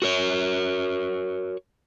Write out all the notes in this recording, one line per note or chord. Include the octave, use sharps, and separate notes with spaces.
F#4 A#4 C#5